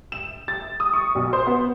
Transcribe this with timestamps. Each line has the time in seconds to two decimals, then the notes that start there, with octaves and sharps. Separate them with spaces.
0.12 E7
0.48 A6
0.80 D#6
0.93 C#6
1.15 B1
1.33 C5
1.47 B3